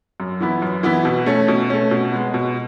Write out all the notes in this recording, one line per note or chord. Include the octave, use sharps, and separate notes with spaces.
F#2
E3 B3 E4
F#2
E3 B3 E4
B2
A3 C#4
B2
A3 C#4
B2
G#3 B3
B2